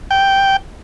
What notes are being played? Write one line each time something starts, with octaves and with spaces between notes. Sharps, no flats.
G5